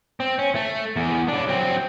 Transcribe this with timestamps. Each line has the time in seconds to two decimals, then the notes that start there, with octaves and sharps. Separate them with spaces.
0.20 C4
0.39 C#4
0.55 A3
0.96 E2
1.28 C#3 D4
1.48 F#3 C4